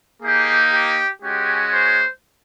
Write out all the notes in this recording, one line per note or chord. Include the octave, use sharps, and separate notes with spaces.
A#3 D#4 G4 G#4
G4
G#3 C#4 F#4 G4
C5